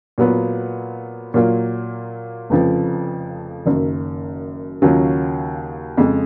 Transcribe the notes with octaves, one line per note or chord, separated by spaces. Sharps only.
A#2 F#3 B3 F4
A#2 F#3 A#3 F4
F1 F2 C#3 F3
F#1 F#2 D#3
D#2 C#3 F#3 C#4 F4
F2 C#3 G#3